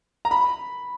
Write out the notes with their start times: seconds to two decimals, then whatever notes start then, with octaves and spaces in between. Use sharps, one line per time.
0.25 A#5
0.31 B5